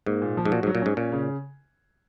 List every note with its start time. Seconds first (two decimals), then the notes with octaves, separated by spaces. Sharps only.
0.06 G#2 A#3
0.22 A#2
0.37 F3
0.45 G#2
0.52 A#2 F#4
0.63 G#2
0.67 F#3
0.75 A#2
0.82 G#2 C#4
0.97 A#2 C#4
1.12 C#3